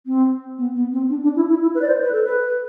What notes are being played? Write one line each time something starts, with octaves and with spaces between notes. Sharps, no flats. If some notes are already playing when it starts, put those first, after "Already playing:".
C4
B3
B3
C4
D4
D4
E4
E4
E4
B4
D5
C5
B4
A4
B4